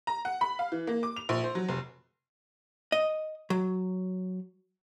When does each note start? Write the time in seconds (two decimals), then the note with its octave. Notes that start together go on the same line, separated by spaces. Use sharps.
0.07 A#5
0.25 F#5
0.41 B5
0.59 F5
0.72 E3
0.87 A#3
1.03 D6
1.16 F7
1.29 A#1
1.44 C5
1.55 F#3
1.69 F1
2.92 D#5
3.50 F#3